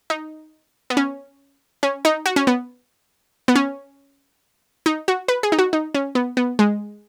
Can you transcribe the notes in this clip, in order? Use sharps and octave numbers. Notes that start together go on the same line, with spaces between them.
D#4
B3
C#4
C#4
D#4
F#4
C#4
B3
B3
C#4
D#4
F#4
B4
G#4
D#4
F#4
D#4
C#4
B3
B3
G#3